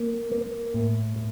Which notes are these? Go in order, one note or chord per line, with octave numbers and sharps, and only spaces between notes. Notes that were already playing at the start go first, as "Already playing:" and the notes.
Already playing: A#3
A#3
A2
A2